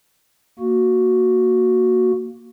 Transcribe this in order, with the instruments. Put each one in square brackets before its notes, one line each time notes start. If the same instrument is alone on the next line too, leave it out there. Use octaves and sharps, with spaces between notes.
[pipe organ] A#3 F#4